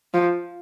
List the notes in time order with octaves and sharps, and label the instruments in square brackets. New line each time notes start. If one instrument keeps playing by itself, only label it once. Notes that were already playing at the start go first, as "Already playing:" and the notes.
[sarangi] F3